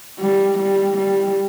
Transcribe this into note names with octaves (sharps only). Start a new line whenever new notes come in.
G3
G3
G3